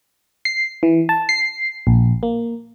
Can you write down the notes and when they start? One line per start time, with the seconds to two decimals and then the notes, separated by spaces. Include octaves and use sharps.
0.45 C7
0.83 E3
1.09 A5
1.29 C7
1.87 A#1
2.23 A#3